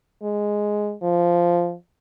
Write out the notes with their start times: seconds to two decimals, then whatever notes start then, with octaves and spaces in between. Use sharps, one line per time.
0.23 G#3
1.03 F3